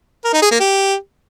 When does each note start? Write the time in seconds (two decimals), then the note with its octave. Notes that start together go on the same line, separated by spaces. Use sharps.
0.25 A#4
0.33 D#4
0.42 G#4
0.51 A#3
0.60 G4